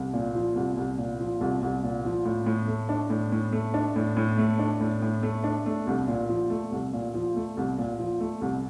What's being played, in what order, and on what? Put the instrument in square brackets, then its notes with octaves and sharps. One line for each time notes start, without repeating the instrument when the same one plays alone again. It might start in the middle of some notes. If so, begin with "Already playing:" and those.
Already playing: [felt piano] C2
A#2
F3
C2
C2
A#2
F3
C2
C2
A#2
F3
A2
A2
A3
D4
A2
A2
A3
D4
A2
A2
A3
D4
A2
A2
A3
D4
A3
C2
A#2
F3
A3
C2
A#2
F3
A3
C2
A#2
F3
A3
C2